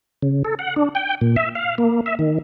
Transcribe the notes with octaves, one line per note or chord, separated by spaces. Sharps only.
C#3
A4
F#5
D4
G5
A#2
E5
F5
A#3
E5
D#3